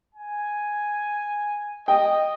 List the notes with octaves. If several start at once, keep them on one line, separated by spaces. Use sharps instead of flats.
G#5
D#5 G5